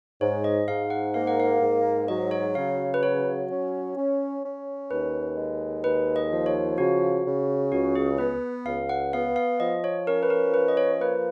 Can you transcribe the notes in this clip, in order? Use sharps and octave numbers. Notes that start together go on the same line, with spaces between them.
G#2 C#5
D#5
G#2 F5
F#5
A#3 F5
F#5
F5
G#2
F#3 D#5
C#5
C#3 F5
B4
F#3 C#5
C#4
C#4
C#4
D#2 B4
G#3
D#2 B4
D#5
F3
C#5
C#3 F#4
C#3
C#2 F#4
G#4
B3 B4
C#2 F5
F#5
B3 F5
F5
F3 D#5
C#5
C#4 A#4
B4
A#4
F3 B4
D#5
C#5
A#3 B4